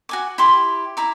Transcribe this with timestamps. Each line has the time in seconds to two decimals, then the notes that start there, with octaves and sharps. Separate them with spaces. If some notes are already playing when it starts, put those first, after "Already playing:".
0.09 F#4 G#5 D6
0.38 E4 G4 C6 D6
0.97 E4 A#5 D6